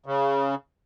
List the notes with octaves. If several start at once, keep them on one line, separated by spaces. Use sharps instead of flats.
C#3